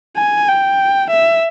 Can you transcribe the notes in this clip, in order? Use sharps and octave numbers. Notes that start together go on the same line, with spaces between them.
G#5
G5
E5